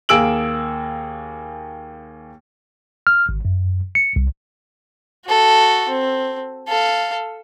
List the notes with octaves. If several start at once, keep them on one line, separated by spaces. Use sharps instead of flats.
D#2 A#3 G#4 E6 D7 F#7
F6
G#1
F#2
C#7
C2
F#4 A4
C4
A4 F5